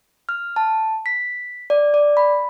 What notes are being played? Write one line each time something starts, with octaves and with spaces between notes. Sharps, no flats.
F6
A5
B6
D5
D5
B5